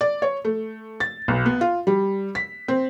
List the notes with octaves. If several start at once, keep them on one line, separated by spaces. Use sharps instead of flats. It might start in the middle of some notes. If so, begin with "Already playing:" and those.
D5
C#5
A3
A6
B1
B3
F4
G3
B6
C4